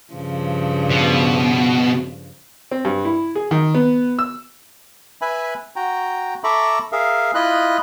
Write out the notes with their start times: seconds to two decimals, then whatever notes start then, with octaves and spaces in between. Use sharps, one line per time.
0.13 G2 C#3 F3
0.91 B2
2.71 C4
2.85 G2
3.05 E4
3.35 G#4
3.51 D#3
3.74 B3
4.19 E6
5.21 B4 E5 G#5 B5
5.76 F#4 G5 A#5
6.44 A4 E5 A#5 B5 C#6 D6
6.92 G#4 A#4 E5 F5
7.35 E4 F4 D#5 B5 F#6